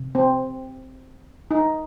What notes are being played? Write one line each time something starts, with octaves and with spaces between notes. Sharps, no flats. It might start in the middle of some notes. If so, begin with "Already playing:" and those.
Already playing: C3
C4
D#4